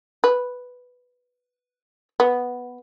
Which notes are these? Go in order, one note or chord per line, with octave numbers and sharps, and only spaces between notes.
B4
B3